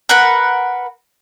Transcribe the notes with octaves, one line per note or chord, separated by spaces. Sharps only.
A#4 B4 F#5